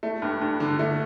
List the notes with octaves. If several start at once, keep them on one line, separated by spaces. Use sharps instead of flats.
A3
G2
G2
D3
A3